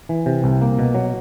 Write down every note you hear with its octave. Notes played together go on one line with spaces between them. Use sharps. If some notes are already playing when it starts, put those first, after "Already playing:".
E3
C3
C2
A#3
B2
F#3